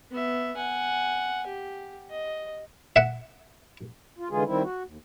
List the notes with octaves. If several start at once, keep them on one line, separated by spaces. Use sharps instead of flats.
B3 E5
F#5 G#5
G4
D#5
E5 F#5
F4
D3 E3 G#3 F4 G#4
D#3 G3 C4 E4
F#4
D#2